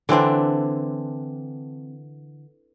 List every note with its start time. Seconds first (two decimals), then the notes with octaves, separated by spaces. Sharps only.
0.09 D3 E3 C4 D4